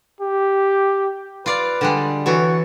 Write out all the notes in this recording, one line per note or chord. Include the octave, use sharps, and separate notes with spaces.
G4
F4 B4 D5 F5
D3 G3 G#3
E3 F#4 A4 C#5